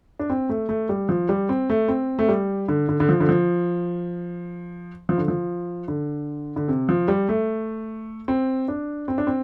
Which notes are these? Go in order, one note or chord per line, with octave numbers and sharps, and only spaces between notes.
D4
C4
A3
A3
G3
F3
G3
C4
A3
C4
A3
G3
D3
D3
D3
F3
D3
F3
F3
D3
F3
D3
D3
C3
F3
G3
A3
C4
D4
C4
D4
C4